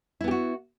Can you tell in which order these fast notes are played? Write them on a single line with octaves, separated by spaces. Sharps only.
E4 B3 G4 F#4